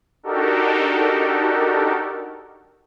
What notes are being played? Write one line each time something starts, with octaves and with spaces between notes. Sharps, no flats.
D4 D#4 F#4 G4 A4 A#4